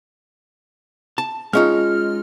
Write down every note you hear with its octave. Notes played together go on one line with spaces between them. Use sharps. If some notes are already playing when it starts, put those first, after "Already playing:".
A5
G#3 C#4 D#4 F4 D#5 F6